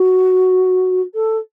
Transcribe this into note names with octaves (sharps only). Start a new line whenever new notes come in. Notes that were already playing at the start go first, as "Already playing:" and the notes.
Already playing: F#4
A4